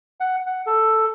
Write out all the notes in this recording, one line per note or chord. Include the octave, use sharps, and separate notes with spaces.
F#5
F#5
A4